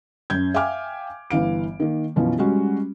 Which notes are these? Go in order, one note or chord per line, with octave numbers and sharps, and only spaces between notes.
F#2 G6 G#6
E5 F5 G5 G#5 D6 F6
G1 E3 F5 D7
D#3 A#3
F#2 B2 E3 F3 C#4
G3 G#3 C#4 F#4